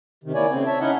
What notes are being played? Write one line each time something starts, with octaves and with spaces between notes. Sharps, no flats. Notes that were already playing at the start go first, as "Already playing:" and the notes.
C3 D#3
A#3 E4 C#5 D5 G#5
C#3 C4
C#5 E5 A5
C#4 D#4 E4 D#5 F#5